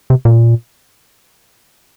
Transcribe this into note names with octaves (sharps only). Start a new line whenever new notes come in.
C3
A#2